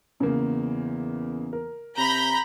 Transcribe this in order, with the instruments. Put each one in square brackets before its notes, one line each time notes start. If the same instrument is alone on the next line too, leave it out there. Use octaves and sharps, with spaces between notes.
[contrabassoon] E2 [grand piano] C#3 A#3
[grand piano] A#4
[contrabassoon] C3 [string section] A#5 B5 G6